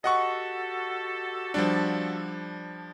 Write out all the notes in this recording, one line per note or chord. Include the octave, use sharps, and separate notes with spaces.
F#4 G4 A4 D#5 F#5 C#6
F3 G3 D4